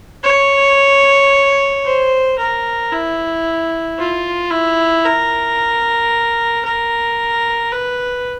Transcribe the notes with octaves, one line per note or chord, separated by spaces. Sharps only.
C#5
C5
A#4
E4
F4
E4
A#4
A#4
B4